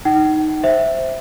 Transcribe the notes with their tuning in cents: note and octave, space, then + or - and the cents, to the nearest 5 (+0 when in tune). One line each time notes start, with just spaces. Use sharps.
D#4 +0 F#5 +45
C5 +0 E5 +0